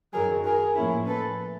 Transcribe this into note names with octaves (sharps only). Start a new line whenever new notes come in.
F#2 D#3 F#3 G#4 A#4
G#4 A#4
A2 F3 A#3 C#4 E4
A4 B4